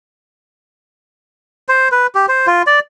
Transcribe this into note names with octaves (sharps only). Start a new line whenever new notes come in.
C5
B4
G4
C5
F4
D5